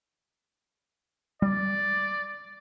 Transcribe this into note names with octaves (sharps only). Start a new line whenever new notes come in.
G3 D5